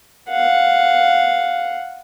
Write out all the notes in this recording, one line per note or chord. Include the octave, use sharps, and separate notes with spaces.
F5 F#5